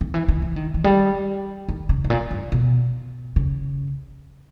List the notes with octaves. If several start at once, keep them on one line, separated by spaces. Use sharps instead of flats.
D#3
E3
D#3
E3
D#3
E3
G3
D#3
C#3
G#2
A#2
G2
B2
C#3